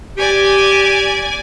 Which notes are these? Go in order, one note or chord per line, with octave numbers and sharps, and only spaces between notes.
G4 D5 G#5